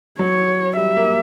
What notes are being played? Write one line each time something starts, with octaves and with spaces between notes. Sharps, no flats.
F#3 C#5
G3 E5
A#3